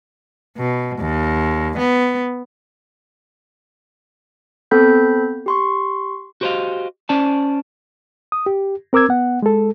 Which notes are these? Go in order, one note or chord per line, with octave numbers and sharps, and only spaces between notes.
B2
D#2
B3
B3 C4 A4 B5 G6 B6
G4 C6 C#6
F#4 G4 C5 C#5 D#5 F5
C#4 C5 D5 A5
D#6
G4
C4 A#4 D6 E6 G#6
B3 F#5
G#3 A4